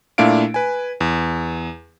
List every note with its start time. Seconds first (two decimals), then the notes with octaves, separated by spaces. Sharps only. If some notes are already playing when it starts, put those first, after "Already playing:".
0.18 A#2 A3 D4 E4 F5 D7
0.54 B4 G#5
1.01 E2